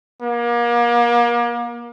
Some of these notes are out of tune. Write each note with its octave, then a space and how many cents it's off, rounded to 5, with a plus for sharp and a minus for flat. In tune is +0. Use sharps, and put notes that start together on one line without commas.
A#3 +35